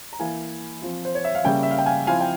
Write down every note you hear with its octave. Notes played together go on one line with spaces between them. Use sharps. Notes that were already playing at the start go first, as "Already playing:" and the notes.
A#5
E3 A#3 E4 F5 G#5
F3 C4 F4
C5
C#5
E5
F5
C#3 G3 A#3 C#4 E5 G5
E5
F5
G5
F5 G#5
F3 C4 E4 F5 G#5
G5